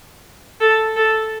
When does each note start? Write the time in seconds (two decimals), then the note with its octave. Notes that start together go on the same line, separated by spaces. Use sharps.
0.60 A4
0.96 A4